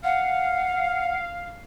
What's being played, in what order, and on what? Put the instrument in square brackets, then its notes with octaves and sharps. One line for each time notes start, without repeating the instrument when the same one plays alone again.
[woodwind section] F5 [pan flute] F#5